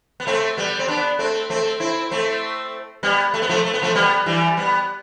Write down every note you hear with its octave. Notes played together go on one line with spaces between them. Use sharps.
B3
A3 C4
G3 B3
C4
B3 D4
A3 C4
A3 C4
C4 E4
A3 C4
G3 B3
A3
B3
F3 A3
A3
B3
F3 A3
G3 B3
E3 G3
G3 B3